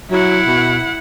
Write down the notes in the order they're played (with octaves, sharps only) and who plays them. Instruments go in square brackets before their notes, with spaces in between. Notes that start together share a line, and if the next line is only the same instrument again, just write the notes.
[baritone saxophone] F#3 [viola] E4 F#5
[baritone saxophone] B2